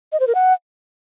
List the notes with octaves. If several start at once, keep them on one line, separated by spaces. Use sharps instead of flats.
D#5
C5
A#4
F#5